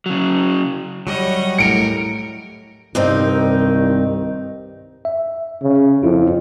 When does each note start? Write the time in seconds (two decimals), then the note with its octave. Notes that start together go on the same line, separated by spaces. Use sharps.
0.06 C#3 F#3
1.07 F#3 G3 C#5 D#5
1.58 A2 A#4 C#7 D7
2.95 C2 G2 D#3 C4 D#4
5.05 E5
5.63 C#3
6.03 F2 E4 F4